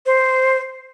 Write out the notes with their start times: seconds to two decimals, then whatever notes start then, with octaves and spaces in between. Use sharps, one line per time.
0.06 C5